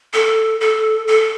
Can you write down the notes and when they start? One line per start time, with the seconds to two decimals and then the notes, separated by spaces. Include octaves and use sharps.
0.13 A4
0.60 A4
1.07 A4